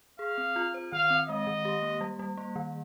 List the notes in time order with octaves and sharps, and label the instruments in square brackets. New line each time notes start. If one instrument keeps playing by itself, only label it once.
[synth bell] G#4 [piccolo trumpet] F5
[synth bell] C4
F4
C5
[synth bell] D#3 [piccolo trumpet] F5
[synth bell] C4
[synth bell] G#3 [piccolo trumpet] D#5
[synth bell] D#3
G4
A#3
G3
G3
A#3
D#3